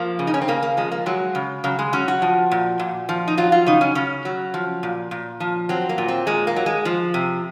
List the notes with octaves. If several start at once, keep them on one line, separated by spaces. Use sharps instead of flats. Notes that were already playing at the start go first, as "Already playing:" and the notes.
Already playing: F3 A#3
C#3
D#4
C#4
C4
C#3 A#3
A#3
F3 G#3
A#3
F#3 G#3
C#3
C#3 F#3
G#3
F#3 C#4
F#4
F3
A#2
A#2
F3
D#4
F#3 F4
F4
C#3 D#4
C#4
C#3 C#4
F#3
F3
A#2
A#2
F3
F#3 C4
A#3
A#2
C4
A#2 G#3
A#3
F#3
G#3
F3
C3